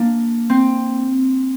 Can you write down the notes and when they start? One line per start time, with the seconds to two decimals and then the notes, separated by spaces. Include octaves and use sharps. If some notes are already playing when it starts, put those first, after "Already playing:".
Already playing: A#3 D4
0.50 C4